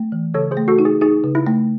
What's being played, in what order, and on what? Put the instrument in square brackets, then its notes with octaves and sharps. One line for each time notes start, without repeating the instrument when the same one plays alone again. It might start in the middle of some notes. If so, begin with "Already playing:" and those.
Already playing: [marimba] A3
E3
[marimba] C#3 [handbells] A4 C#5
[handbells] G#4 C5
[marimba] A3
[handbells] F#4 A4
[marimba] D#4
[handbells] G#4
[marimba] D#4 [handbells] G#4
[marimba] C#3
[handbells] E4
[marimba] A3